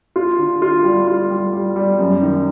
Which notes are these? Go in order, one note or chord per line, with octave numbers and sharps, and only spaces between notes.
F4
D3
F4
G3
F4
G3
G3
G3
F#2
D#3